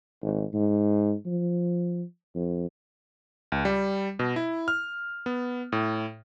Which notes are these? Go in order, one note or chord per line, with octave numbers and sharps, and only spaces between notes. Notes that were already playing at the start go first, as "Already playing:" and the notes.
G#1
G#2
F3
F2
C#2
G3
B2
E4
F6
B3
A2